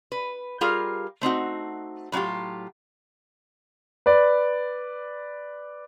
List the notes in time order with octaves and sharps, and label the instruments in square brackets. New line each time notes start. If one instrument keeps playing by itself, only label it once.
[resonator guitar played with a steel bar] B4
G3 F4 G4 G#4 A#4 F5
A3 C4 D#4 F#4
A2 F#3 C#4 F4 G4
[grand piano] B4 D5